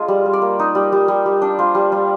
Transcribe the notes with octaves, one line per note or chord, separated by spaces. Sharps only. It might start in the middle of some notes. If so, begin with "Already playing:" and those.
Already playing: G#3 D4 F4
G3
G3
D5
A#3
D#4
G3
G3
G3
G3
D4
F4 C5
G3
G3